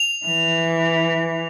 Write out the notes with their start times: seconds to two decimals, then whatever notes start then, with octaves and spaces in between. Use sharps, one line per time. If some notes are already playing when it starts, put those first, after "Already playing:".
Already playing: F7
0.26 E3